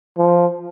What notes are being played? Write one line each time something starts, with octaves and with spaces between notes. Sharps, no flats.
F3